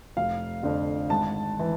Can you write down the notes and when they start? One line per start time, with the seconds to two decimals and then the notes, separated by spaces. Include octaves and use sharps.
0.17 F1 F5
0.63 F2 D3
1.10 G#1 A5
1.59 E3